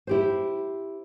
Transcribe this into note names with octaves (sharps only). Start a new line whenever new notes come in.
E4 G4 C5